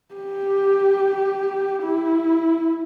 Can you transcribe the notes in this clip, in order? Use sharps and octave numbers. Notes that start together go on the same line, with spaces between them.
G4
E4